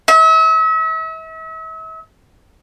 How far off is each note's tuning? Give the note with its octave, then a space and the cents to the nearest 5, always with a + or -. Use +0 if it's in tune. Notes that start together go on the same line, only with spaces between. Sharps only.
E5 -40